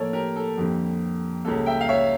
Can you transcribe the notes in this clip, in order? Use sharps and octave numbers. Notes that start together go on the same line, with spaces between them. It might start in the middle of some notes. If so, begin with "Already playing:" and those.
Already playing: A2 F3 A#3 A4 A#4 C#5 D5
G4 A#4
A4
F2 D3 G3 A#3 G4
C#2 C#3 G3 A#3 A4
E5 G5
F5
C#5 E5